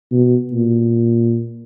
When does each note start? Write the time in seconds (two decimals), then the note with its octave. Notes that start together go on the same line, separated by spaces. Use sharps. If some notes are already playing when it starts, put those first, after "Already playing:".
0.12 B2
0.53 A#2